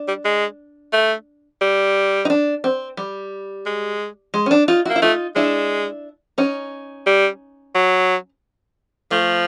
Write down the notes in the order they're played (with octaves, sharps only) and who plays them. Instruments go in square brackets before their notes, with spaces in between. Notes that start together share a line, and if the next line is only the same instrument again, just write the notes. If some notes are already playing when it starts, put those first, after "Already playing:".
Already playing: [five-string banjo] D4
[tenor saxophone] G3
G#3
A3
G3
[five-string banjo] D#4
D4
C4
G3
[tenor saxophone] G#3
[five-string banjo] G#3
C#4
D4
D#4 F4
[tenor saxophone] A#3 [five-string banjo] E4 F#4
[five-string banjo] E4
[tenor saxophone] A3 [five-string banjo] D#4 F4
[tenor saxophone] G#3 [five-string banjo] D4 E4
[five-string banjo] C#4 D#4
[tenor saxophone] G3
F#3
[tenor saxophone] F3 [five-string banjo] A3